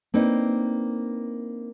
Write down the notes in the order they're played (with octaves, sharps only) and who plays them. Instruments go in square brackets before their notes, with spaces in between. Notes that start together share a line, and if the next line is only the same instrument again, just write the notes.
[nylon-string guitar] A#3 C4 D4 D#4 B4